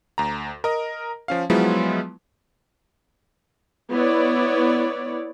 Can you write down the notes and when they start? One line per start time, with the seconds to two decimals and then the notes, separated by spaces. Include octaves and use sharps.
0.18 D2 A#5
0.64 A#4 D#5 A#5
1.28 F3 C#4 F5
1.50 F3 F#3 G#3 B3 E4 F4
3.89 B3 E4 C#5 D5